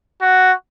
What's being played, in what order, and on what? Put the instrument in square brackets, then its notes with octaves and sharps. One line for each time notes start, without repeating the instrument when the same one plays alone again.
[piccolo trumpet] F#4